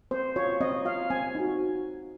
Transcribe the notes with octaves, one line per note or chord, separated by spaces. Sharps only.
C4 C5
F4 C#5
C4 D#5
F4 F5
C4 G#5
D#4 F#4